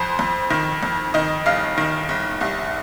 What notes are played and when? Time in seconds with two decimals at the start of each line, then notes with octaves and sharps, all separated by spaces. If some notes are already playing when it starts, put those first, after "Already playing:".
Already playing: F2 C5
0.19 F2
0.50 D#3
0.83 F2
1.14 D#3 D#5
1.46 G1 F5
1.78 D#3
2.09 G1
2.41 C2